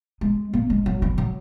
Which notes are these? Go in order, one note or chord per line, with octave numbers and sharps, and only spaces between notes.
G#3
A#3
G#3
F#3
E3
F#3